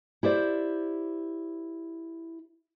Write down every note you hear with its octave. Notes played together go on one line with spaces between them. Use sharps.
E4 G4 C5 D5